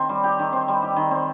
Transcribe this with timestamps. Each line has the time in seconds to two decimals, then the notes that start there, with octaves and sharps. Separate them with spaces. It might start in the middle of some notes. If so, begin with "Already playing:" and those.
Already playing: D#3 C4
0.09 G3
0.24 G4
0.39 D#3
0.52 C4
0.68 G3
0.82 G4
0.96 D#3
1.11 C4